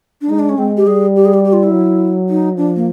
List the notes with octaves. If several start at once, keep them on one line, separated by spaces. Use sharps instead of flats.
D4
G#3 D#4
D4
C#4
G#3 C4
G4
G3 G#4
G4
G#4
G4
G4
F4
E4
F#3
D#4
F3 D4
A#3